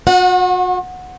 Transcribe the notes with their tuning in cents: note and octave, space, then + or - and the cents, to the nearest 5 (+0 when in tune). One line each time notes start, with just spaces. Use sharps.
F#4 -40 F#5 -15